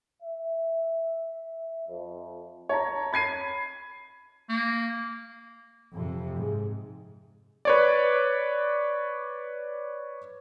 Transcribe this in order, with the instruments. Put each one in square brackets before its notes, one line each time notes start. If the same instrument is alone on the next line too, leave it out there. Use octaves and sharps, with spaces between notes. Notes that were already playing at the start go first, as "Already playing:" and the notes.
[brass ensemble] E5
F2
[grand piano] C#5 A5 A#5
B5 G#6 C7 D#7
[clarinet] A#3
[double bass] F2 C3
G#2
[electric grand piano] B4 C#5 D5